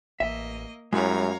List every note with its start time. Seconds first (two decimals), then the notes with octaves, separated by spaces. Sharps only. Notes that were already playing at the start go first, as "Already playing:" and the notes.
0.20 A1 A#3 D#5 E5
0.93 F#2 G3 G#3 E4 C#5 F5 A#5